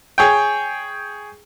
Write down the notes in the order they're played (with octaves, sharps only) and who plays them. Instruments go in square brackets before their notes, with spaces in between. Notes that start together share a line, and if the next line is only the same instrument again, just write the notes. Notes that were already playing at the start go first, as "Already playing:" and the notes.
[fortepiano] G#4 C#5 G5